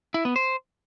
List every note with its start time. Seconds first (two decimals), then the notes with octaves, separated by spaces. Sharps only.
0.14 E4
0.25 B3
0.36 C5